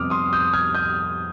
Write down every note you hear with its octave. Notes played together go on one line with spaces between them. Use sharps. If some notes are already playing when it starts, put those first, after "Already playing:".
Already playing: F2 C3 G3 B3 D6 D#6 F6
C6 D#6
D#6 G6
F6 G#6
D#6 G6